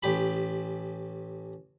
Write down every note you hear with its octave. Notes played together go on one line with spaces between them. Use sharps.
A1 G4 B5